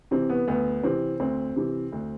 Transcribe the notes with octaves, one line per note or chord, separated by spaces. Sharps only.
C3 E3 C4
B3
D2 B3
C3 E3 C4
D2 C4
C3 E3
D2